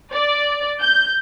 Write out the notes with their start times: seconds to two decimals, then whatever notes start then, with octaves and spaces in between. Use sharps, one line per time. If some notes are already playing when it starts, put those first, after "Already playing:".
0.12 D5
0.80 G6